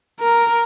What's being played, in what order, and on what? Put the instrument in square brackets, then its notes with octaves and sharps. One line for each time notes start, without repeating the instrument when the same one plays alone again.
[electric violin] A#4